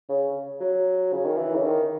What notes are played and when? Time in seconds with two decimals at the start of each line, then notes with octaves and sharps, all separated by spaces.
0.09 C#3
0.60 F#3
1.13 C#3
1.25 D#3
1.37 E3
1.55 C#3
1.64 D#3